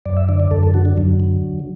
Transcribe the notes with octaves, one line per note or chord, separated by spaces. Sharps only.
F#2 D5
E5
D3 D5
D5
F#2 A4
A4
D3 F#4
D4
F#2 F#3
D3